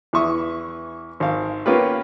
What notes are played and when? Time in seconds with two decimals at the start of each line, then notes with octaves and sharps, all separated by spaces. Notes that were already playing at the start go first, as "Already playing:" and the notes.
0.13 E2 E3 E5 C#6 D#6
1.20 G#1 F5
1.66 A#3 B3 C#4 F4 G4 B4